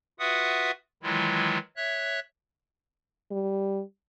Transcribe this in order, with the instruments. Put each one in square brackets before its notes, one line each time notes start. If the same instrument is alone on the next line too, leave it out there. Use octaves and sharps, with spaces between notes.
[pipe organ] F4 F#4 B4 E5 F#5 D#6
D#3 E3 F#3 G#3 E4 F4
C#5 E5 F#6
[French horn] G3